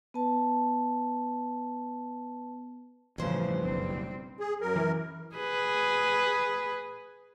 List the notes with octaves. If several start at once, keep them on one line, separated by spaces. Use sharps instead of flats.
B3 B4 A5
A1 G2 C#3 E3 F3 C5
F#1 B1 G2 G3 C4
G#4
F#2 A#4
E3
G#4 B4